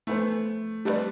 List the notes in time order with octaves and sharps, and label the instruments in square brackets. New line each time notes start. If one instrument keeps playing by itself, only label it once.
[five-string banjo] E3 B3 F#4 C5 [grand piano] A3
[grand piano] G3 [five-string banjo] A3 C4 E4 B4 D5